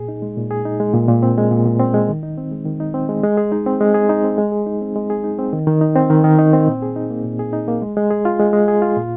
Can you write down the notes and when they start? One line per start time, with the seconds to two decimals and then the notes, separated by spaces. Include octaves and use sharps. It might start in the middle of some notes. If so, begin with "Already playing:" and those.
Already playing: A#2 G#4
0.08 D#4
0.22 G#3
0.37 A#2
0.51 G#4
0.65 D#4
0.80 G#3
0.94 A#2
1.08 A#2
1.23 C4
1.37 G#3
1.51 A#2
1.65 A#2
1.80 C4
1.94 G#3
2.08 D#3
2.23 D#4
2.37 C4
2.52 G#3
2.66 D#3
2.80 D#4
2.94 C4
3.09 G#3
3.24 G#3
3.37 G#4
3.52 D#4
3.66 C4
3.81 G#3
3.95 G#4
4.09 D#4
4.24 C4
4.38 G#3
4.52 G#4
4.66 D#4
4.81 C4
4.96 G#3
5.10 G#4
5.24 D#4
5.39 C4
5.53 D#3
5.67 D#3
5.81 D#4
5.96 C4
6.10 D#3
6.24 D#3
6.39 D#4
6.53 C4
6.68 A#2
6.82 G#4
6.96 D#4
7.11 A#3
7.24 A#2
7.39 G#4
7.53 D#4
7.68 A#3
7.82 G#3
7.97 G#3
8.11 G#4
8.25 F4
8.39 G#3
8.53 G#3
8.68 G#4
8.82 F4
8.97 A#2